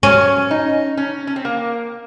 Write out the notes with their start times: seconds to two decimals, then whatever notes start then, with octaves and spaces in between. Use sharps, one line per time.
0.03 F#3 C#4
0.51 D#4
0.97 C#4
1.27 C#4
1.36 C4
1.45 A#3